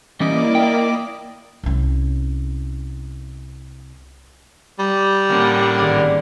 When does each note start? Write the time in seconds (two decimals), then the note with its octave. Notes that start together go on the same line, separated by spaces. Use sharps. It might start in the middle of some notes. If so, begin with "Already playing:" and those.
0.20 E3 G3 A#3 C#4 E4 D5 D#5 D6
0.55 G5
1.63 C2 C#4
4.79 G3
5.29 A2 D3 A#3 C4 C#4 A#4
5.78 G#1 D5 G#6